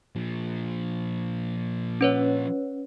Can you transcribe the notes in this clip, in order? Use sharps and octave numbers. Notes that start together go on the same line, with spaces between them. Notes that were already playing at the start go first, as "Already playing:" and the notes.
A#2 F3
C#4 B4 C#5